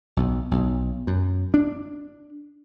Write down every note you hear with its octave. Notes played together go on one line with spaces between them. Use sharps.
B1
B1
F#2
D4